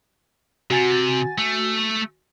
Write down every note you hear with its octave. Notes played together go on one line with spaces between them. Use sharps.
C3 F#4 G#5 A6
A3